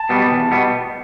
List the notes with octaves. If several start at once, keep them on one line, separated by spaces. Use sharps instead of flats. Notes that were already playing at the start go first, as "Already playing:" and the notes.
Already playing: A5
B2 G3 B3
E2
B2 G3 B3